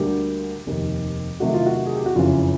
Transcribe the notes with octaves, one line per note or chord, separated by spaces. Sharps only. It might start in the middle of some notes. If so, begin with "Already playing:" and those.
Already playing: D2 D3 G3 A#3 G4
F1 D#2 D#3
C3 D#3 F#3 A3 F#4
F4
F#4
G#4
G4
F#4
F#1 F2 C#3 E3 F4